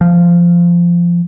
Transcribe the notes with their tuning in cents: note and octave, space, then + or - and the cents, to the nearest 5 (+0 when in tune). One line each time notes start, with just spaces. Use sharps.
F3 -15